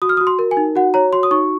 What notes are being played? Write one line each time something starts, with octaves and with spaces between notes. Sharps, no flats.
F#4 D#6
F6
D#6
F#4
C6
A#4
G#5
D#4
F#4 F#5
C#5 A#5
F#4 C6
D#6
D#4 C#6